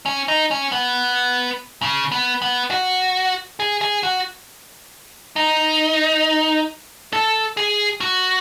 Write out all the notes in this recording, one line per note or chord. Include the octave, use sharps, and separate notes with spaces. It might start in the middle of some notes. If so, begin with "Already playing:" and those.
C#4
D#4
C#4
B3
C#3
B3
B3
F#4
G#4
G#4
F#4
D#4
A4
G#4
F#4